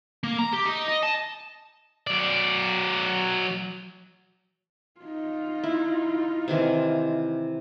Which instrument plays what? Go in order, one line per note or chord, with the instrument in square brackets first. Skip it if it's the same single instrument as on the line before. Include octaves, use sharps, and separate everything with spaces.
[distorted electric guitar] A#3
A#5
G4
D#4
D#5
A5
F#3 D5
[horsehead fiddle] D#4 F4
[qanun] E4
C3 D#3 E3